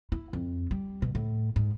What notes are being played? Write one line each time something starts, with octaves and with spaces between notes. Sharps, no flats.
E4
F2
G3
B2
A2
G#2